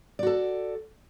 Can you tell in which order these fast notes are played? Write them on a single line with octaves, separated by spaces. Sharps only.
D5 F#4 A4